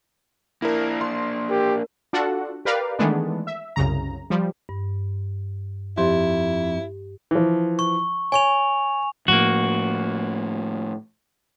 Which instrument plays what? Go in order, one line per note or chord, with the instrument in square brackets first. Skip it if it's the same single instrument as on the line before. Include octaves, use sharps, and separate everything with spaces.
[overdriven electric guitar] A#3 D4 [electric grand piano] E4 A#4
[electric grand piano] C6
[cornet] G4 [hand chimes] A#4
[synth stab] D4 F4 F#4 A4 F#5
G4 A#4 B4 D5 F5
D#3 E3 G#3 A3 B3 D4
E5
C2 F#2 C#3 A#5
F3 G3
[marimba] G2
[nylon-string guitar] F2 [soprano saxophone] E4 [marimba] G4 C6
[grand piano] E3 F3
[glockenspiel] C#6
[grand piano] C#5 [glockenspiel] G#5 C#6 F7
[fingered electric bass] A2 F3 [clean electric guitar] A#3 F#4